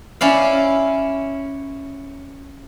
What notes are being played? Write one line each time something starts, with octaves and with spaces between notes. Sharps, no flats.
C#4 E4 D5 F5